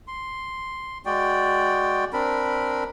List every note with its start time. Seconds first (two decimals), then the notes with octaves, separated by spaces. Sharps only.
0.07 C6
1.05 G#3 F#4 D5 G5
2.13 C4 D4 A#4 B5